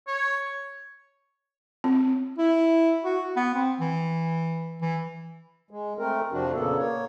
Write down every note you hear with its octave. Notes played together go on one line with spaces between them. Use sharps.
C#5
C4
E4
F#4
B3
C4
E3
E3
G#3
A3 C4 A#4
F2 C3 F3 D4 F#4
A#2 C#3 A#3 B3 A4
A#3 C#5